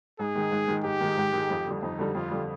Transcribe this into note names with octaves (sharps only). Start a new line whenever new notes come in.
G#2 G#4
D#3 G#3
G#2
D#3 G#3
G#2 G4
D#3 G#3
G#2
D#3 G#3
F2
D3 G3
F2 D#4
D3 G3
F2 F4
D3 G3